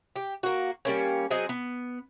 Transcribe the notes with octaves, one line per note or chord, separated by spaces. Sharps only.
G4
A#3 F#4
G3 A#3 C#4
F#3 C4 G#4 D#5
B3